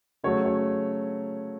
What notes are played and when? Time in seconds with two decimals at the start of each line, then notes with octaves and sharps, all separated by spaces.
0.24 C#3 F#3 A3 C#5
0.45 C#5